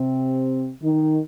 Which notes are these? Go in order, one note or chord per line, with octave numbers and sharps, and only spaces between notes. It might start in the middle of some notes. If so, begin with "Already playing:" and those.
Already playing: C3 C4
D#3 D#4